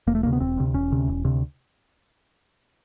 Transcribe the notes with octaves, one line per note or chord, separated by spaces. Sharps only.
E1 A#3
A3
D2 C3 A#3
B3
E1 C4
D2 C3
E1 C#4
D2 C3
E1
D2 C3